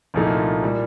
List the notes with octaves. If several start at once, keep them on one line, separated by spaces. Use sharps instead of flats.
C2 A#2 F3 A3 D#4
A#2 G3